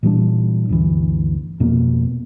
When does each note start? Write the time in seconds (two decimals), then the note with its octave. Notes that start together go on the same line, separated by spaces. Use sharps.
0.03 A#2 E3 G3 D4
0.69 G1 D2 E3
1.60 F2 B2 A#3 B3